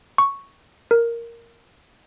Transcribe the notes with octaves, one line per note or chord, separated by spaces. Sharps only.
C#6
A#4